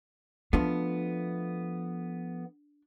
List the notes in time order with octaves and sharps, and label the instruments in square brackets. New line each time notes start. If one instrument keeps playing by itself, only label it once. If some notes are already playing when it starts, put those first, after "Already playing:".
[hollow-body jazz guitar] F3 A3 B3 [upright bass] D4